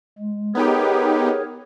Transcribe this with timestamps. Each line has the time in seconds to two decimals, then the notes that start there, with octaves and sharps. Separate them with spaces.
0.18 G#3
0.55 B3 D#4 G4 G#4 A#4 C#5